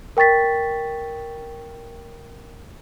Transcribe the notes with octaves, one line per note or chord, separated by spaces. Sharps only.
A#4 G5 C#6 A6 B6